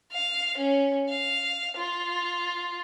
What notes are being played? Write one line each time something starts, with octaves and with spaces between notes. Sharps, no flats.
F5
C#4
F5
F4